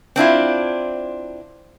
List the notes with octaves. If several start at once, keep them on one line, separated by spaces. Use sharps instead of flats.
C4 D4 E4 F4